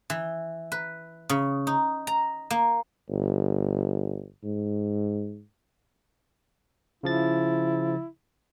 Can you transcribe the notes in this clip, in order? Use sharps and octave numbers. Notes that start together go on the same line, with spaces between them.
E3
B4
C#3
D#4
A#5
A#3
G1
G#2
C#3 F3 E4 A6